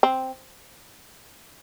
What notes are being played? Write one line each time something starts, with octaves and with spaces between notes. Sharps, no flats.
C4